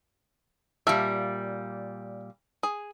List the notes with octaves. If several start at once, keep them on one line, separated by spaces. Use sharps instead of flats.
A#2 G3 E5 F5 A5
G#4